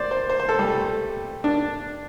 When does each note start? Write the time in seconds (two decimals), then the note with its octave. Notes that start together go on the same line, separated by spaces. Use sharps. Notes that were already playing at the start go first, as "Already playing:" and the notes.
Already playing: C5 D5
0.11 C5
0.29 C5
0.40 C5
0.49 A4
0.59 G3
0.68 A3
1.44 D4